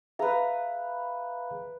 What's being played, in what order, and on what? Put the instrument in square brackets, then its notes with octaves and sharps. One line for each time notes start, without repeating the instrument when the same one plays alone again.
[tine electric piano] G#4 E5 F5 [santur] B4 A#5